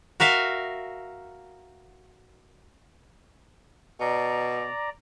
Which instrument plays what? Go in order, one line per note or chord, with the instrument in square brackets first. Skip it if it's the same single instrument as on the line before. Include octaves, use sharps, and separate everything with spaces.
[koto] F#4 A#4 E5 F5
[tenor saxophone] B2 [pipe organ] D5 A#5